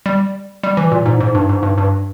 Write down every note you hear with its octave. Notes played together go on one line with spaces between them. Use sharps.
G3
G3
E3
A#2
G#2
G#2
G2
G#2
G2
G2